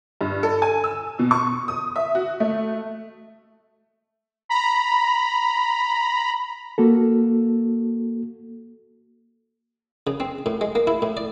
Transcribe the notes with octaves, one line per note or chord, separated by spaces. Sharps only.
G2
A4
G#5
E6
B2
C#6
D#6
E5
F#4
A3
A#5 B5
A#3 F#4 A4
C#3
C4
A2
G#3
A#3
E4
A2
D5